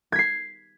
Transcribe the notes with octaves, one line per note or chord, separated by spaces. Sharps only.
G#6 B6 C7